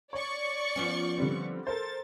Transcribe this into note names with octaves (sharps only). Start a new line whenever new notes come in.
C#5 D5 C#6
F3 B3 C#4
D3 G3 C4
A4 A#4 C5 A6